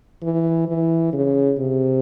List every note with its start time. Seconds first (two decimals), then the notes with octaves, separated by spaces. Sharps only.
0.23 E3
0.68 E3
1.13 C#3
1.59 C3